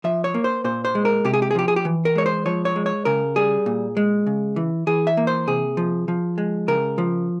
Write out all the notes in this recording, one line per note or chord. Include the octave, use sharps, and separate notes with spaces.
F3 E5
C#5
A#3
C5
A#2 C5
C5
G#3
A#4
C3 G4
G#4
G4
G#4
F3 G4
G#4
G4
E3
A#4
G#3 C#5
C5
F3 C#5
C#5
G#3
C#5
C#3 A#4
G3 G#4
A#2
G#3
C#3
E3
E3 G#4
E5
A#3
C5
C3 G#4
F3
F3
G#3
C#3 A#4
F3